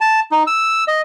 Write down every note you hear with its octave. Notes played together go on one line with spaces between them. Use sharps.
A5
D#4
E6
D#5